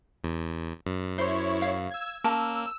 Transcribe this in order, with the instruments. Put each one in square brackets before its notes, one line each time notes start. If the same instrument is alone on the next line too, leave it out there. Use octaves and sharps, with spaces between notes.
[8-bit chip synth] E2
F#2
[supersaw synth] E4 C#5 [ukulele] C5
[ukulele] F5
[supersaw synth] E6 G#6
[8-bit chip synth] A#3 [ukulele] C#4 A#4 A5 [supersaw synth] E6